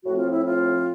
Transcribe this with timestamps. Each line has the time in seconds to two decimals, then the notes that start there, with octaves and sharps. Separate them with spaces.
0.04 A2 F3 A3 C4 F#4
0.17 F4
0.31 E4
0.45 F4